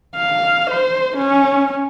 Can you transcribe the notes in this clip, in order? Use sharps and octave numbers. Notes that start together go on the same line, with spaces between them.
F5
C5
C#4